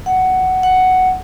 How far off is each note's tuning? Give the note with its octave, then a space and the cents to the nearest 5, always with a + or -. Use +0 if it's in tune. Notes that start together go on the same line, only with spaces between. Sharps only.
F#5 +10
F#5 +5